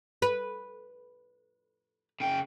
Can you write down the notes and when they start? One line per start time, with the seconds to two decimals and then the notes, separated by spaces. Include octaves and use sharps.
0.22 B4
2.20 C#3 G5